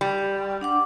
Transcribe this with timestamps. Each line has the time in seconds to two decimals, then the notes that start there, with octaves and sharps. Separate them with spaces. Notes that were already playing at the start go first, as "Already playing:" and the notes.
0.01 G3
0.61 D4 F#5 D6